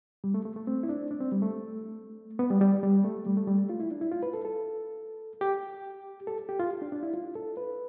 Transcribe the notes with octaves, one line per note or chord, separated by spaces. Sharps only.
G3
A3
A3
A3
C4
E4
D4
D4
C4
G3
A3
B3
G3
G3
G3
A3
G3
A3
G3
A3
F4
E4
D4
E4
F4
B4
A4
A4
G4
A4
G4
F4
D4
D4
E4
F4
A4
B4